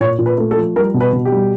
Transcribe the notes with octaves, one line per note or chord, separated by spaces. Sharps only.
A#2 C#5
A#2
B4
A3
A4
F3
G3 A#4
B2
B4
B2
G4
G3